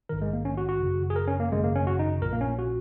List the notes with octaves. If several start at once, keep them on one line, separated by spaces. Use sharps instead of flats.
A#1 G#2 D#3 A#4
G#3
A#3
C#4
F#4
F#4
G#1 F#2 C#3
G#4
A#4
C#4
A#3
G#1 F#2 C#3 G#3
A#3
C#4
F#4
D#4
A#1 A#2 A#4
A#3
C#4
F#4